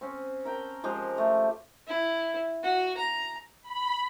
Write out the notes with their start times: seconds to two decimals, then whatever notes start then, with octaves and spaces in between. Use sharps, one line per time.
0.01 C4 C#4
0.45 A#4 G5 A5
0.84 F3 G#3 G4 A#5
1.18 A3
1.88 E4
2.63 F#4
2.97 A#5
3.62 B5